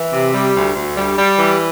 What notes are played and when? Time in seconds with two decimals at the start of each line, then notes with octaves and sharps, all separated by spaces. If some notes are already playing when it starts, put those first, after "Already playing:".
Already playing: E3
0.13 C3
0.34 G3
0.55 D2
0.76 D2
0.97 G3
1.18 G3
1.39 E3